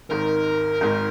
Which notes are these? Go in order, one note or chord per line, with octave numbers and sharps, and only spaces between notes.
G#1 G#2 D#3 A#4
G#1 G#2 D#3